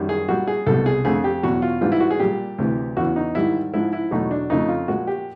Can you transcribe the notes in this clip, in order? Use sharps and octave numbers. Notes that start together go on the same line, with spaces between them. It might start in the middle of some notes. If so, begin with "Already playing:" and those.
Already playing: F#2 D#3 G3
G#4
A#2 G3 F#4
G#4
C2 B2 G3 A4
G#4
F2 D3 F3 A3 G#4
G4
E2 B2 F#3 F#4
F4
G#2 E3 G3 F4
E4
F#4
G#4
A#2 G3 G4
D2 C3 E3
E2 C#3 E3 F#4
D#4
G#2 D#3 G3 E4
G#2 F3 G#3 E4
E4
E2 B2 F#3 A3 D#4
D4
F2 C#3 F3 A3 D#4
F4
A#2 F3 G#3 F#4
G4